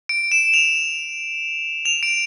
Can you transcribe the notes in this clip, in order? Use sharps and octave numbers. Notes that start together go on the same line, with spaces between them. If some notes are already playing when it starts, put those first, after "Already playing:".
D7
E7
F7
F7
D7